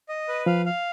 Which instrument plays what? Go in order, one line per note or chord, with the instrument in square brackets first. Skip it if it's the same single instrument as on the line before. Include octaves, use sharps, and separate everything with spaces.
[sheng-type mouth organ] D#5
B4
[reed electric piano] F3 [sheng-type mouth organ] F5
[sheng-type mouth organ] F5